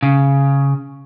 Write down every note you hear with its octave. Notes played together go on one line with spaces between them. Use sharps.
C#3